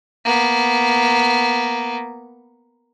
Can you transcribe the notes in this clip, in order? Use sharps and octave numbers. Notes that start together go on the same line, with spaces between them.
A#3 B3